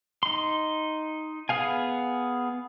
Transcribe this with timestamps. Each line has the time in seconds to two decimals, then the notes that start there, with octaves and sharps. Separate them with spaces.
0.23 D#4 C6
1.49 B3 G#4 F5 G#5